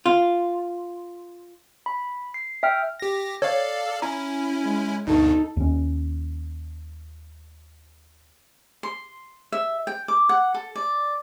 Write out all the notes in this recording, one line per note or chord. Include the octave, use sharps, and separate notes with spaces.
F4
B5
C7
E5 G5 F6
G4 A#6
A4 C#5 D5 F5
C#4 E4 A#5
G#3
D2 G2 B2 D#4 A4
D#2 C#4
C6
E5
G5
D6
F#5
A4
D5